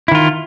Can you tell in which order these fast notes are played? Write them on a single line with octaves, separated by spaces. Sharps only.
E4 D#3 F4